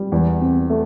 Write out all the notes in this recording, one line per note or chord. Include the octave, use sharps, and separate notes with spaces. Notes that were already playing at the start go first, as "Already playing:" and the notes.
Already playing: G3
E2
C4
A3